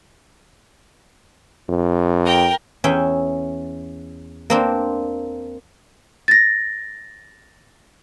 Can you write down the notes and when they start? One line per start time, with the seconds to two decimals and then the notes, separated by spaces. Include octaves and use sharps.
1.70 F2
2.25 A#4 G5
2.84 E2 C#4 E5 G5
4.50 A#3 C4 D4
6.28 A6 A#6